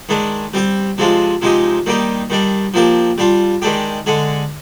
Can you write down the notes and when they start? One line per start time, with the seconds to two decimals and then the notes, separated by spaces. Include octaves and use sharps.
0.09 D#3 G#3 D4
0.54 G3 C4 G4
0.98 C3 F3 G#3 D4 F4
1.42 C3 F3 G#3 D#4 G4
1.86 D#3 G3 A#3 D#4 G4
2.30 D#3 G3 D4
2.74 F3 A#3 D4 G4
3.18 G3 D4 F4
3.62 D#3 G#3 D4 G4
4.06 D3 G#3 D4